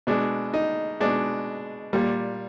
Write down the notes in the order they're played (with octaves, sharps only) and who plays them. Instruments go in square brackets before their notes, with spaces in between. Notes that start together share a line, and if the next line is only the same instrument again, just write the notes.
[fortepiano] B2 G#3 D4
D#4
B2 G#3 D4
A#2 G3